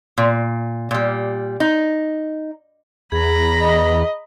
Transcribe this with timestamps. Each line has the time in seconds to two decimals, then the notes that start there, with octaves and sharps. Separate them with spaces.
0.18 A#2
0.91 A#2 G3
1.60 D#4
3.12 E2 G#4 A#5 B5
3.62 D#5